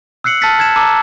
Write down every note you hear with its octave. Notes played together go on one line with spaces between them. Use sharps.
E6 F#6 C7 C#7 F#7
A5 E6 F6 A6 B6 C#7
A5 G#6 E7
A5 A#5 D6 E6